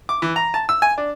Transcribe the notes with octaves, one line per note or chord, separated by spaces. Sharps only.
D6
E3
A#5
A5
E6
G#5
D4